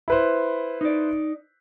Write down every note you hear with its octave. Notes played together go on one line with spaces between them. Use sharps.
E4 B4 C5
D#4 D5